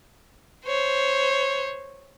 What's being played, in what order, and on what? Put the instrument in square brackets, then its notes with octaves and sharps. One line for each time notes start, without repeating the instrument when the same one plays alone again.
[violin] C5 C#5